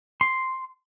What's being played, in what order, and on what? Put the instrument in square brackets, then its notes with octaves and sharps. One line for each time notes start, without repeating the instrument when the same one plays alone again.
[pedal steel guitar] C6